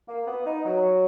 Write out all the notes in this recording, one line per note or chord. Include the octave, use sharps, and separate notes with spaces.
A#3
B3
D#4
F#3